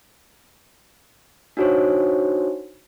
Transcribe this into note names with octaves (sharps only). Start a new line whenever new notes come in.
D4 D#4 F#4 C5 C#5